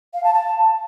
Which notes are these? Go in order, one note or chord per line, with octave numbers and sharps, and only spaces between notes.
F5
A5
A5